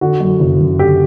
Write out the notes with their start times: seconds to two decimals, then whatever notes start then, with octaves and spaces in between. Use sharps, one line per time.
0.01 D3 F#4
0.20 F#2
0.40 F#1
0.61 F#1
0.79 D3 G4